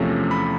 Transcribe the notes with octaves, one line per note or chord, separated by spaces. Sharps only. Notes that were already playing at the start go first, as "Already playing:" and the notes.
Already playing: E2 C3 F3 A3 C#4
B5